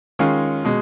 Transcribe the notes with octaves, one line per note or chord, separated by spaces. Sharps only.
D#3 G#3 C#4 F4
B2 G#3